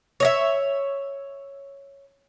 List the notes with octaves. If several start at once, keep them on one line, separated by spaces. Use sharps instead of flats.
C#5 D#5 E5